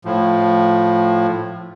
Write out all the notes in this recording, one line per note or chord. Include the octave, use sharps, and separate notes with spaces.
A2 F3